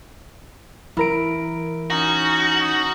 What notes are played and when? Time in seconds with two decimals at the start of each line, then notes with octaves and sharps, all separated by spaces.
0.97 E3 E4 A#4 D7
1.90 C#4 D#4 F#4